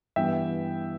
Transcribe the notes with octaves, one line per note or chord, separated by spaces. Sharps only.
G2 E3 B3 E4 E5 G5